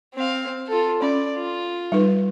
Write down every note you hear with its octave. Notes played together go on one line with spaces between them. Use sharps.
C4 F5
F4 A4
C#4 D5
F4
G3 D#4 B4